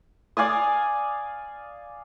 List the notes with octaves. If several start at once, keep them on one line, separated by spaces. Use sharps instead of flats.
D5 F5 G#5 D#6